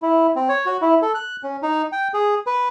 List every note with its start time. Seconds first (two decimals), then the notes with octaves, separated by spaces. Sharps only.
0.02 E4
0.36 C4
0.49 C#5
0.66 F#4
0.82 E4
1.02 A4
1.15 F#6
1.43 C#4
1.62 D#4
1.92 G5
2.14 G#4
2.47 B4